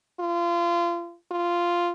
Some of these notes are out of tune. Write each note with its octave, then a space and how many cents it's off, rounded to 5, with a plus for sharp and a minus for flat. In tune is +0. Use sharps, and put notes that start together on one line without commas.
F4 -30
F4 -5